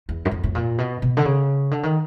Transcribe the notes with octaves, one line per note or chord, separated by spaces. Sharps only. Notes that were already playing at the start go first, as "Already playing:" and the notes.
E2
F#2
F2
A2
A#2
B2
B2
D3
C#3
D3
D#3